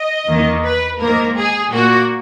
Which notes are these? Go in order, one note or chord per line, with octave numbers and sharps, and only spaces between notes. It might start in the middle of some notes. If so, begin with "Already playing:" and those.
Already playing: D#5
E2 D#3 A#3
B4
G#2 D#3 A#3 A#4
G#4
A#2 A#3 F#4